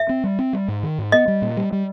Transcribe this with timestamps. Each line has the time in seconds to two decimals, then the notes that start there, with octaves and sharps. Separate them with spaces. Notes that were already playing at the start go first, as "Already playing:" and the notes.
Already playing: E5
0.09 C4
0.24 G3
0.39 C4
0.53 G3
0.68 G#2
0.83 D#3
0.98 G#2
1.12 B3 D#5
1.28 G3
1.42 A#2
1.57 G3
1.72 G3